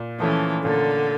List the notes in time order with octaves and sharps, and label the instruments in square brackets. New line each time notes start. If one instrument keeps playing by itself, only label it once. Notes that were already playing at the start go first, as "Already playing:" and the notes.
Already playing: [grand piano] A#2
[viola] E3 [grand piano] F3 A3 C#4
[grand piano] A#2 [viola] D3